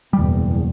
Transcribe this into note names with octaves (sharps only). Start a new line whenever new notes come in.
F#1 E2 B2 G3